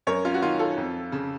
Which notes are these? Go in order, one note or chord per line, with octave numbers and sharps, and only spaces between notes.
F#2 A#4 C#5
C#4 F4
F#4
D#3 C#4 F4
F4 A4
F2
C#3